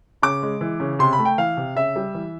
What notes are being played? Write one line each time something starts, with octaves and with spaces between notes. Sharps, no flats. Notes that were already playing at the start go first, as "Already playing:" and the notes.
C#3 D6
G#3
E3
C#3
C3 C6
B5
A3
G5
E3 F5
C3
C#3 E5
G3
E3